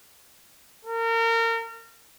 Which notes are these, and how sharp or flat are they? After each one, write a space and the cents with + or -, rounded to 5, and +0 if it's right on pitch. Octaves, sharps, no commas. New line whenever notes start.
A#4 -30